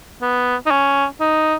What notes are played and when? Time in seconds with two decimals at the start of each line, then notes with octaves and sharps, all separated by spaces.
0.22 B3
0.66 D#4
0.71 C#4
1.20 D#4